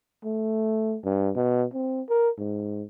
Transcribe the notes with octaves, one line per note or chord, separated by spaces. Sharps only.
A3
G2
B2
C4
A#4
G#2